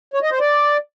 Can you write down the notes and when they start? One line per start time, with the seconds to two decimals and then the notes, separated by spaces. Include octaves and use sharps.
0.14 C#5
0.22 D#5
0.31 C5
0.40 D5